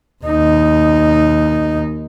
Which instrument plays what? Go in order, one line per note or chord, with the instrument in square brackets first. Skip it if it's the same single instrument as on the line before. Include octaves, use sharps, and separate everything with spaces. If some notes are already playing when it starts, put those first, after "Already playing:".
[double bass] D#2 D#4